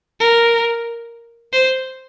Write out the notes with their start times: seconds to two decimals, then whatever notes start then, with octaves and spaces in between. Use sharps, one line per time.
0.20 A#4
1.53 C5